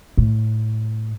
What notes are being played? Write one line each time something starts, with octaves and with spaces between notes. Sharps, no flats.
A2